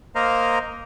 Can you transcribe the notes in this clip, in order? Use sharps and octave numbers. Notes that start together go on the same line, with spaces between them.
A#3 A#4 C5 D#5 F5 A#5